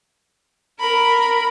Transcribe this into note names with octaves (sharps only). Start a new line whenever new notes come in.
A#4 B5